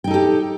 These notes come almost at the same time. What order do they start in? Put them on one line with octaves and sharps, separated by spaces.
G5 D#4 A4 G4